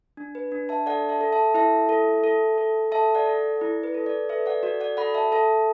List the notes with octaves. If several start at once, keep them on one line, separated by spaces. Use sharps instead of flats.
D4
B4
D4
E5 A5
A4 D5 F#5
E5 A5
A4
E5 A5
E4 E5 A5
A4
A4
A4
A4 E5 A5
D5 F#5
A4
E4 D5
B4
A4
D5
A4 B4 E5
D5 F#5
F#4 D5 F#5
D5 F#5
A4 F#5 B5
E5 A5
A4 E5 A5